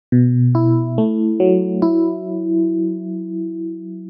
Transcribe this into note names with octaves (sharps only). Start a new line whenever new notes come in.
B2
E4
A3
F#3
E4